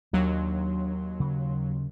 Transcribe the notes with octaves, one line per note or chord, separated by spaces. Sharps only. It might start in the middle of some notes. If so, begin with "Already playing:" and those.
D#2 F#3 D4 C6
C#3